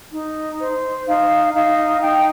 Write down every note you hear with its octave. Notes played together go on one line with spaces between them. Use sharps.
D#4
C5
D#4 F5
D#4 F5
D#4 G5